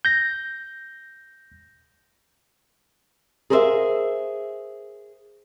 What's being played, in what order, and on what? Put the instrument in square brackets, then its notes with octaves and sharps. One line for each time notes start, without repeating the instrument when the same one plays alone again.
[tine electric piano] G6 A#6
[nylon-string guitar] G#4 A#4 C5 D5 E5 F5